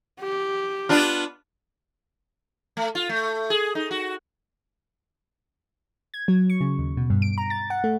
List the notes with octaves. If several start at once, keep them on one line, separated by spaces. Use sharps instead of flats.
G4
B3 D4 F4
A3
F4
A3
G#4
D#4
F#4
G#6
F#3
C#6
C#3
D#2
B2
G2
D7
A#5
A6
F#5
A3